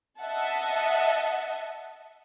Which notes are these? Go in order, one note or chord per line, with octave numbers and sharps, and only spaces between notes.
D#5 E5 F#5 A5